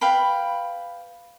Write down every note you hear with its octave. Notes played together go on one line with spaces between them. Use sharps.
B4 F5 G5 B5